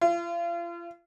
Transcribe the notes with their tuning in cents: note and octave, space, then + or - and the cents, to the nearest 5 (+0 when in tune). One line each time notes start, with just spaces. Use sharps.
F4 -40